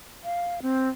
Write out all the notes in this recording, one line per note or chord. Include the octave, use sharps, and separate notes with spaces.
F5
C4